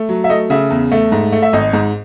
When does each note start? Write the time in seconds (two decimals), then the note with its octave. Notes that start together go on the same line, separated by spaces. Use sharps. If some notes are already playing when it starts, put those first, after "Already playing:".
Already playing: A3
0.09 F#3
0.24 E5
0.29 A3 D#5
0.50 C#3 E5
0.70 E2
0.92 A3
1.12 G#2
1.32 A3
1.42 E5
1.53 G#1 D#5
1.73 G#2